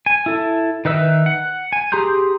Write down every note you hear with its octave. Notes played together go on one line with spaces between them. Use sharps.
G#5
E4 A4
D#3 D#4 B4 E5 E6
F#5
G#5
G4 G#4 A#5 C6 G6